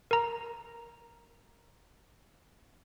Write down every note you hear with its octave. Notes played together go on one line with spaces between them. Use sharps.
A#4 A#5